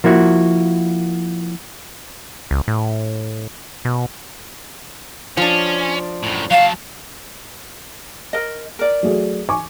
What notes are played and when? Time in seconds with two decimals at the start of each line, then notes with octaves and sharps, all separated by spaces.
0.04 F3 A#3 E4 F#4
2.51 C#2
2.68 A2
3.85 B2
5.37 F3 C#4 D4
6.23 F#2 A2
6.51 F#3 F5 A5
8.33 A#4 D#5
8.79 A#4 D5
9.03 F#3 A3 G#4
9.49 G#5 C#6 D6